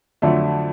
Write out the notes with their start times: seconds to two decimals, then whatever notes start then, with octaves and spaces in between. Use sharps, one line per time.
0.22 F2 D3 F#3 A3